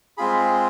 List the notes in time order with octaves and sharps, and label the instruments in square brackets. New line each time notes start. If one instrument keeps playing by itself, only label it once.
[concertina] G#3 C4 F4 G#4 B5